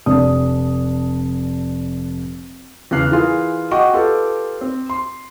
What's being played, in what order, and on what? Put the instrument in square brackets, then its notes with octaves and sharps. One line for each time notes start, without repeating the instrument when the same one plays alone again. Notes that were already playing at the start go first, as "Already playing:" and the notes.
[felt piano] F1 D4 D#6
E2 C#3 F5 F6 F#6 C7
E3 F4 G#4 A#4
F#4 D#5 F#5 G5 C#6 D6
F4 G4 A4 B4
C4
C6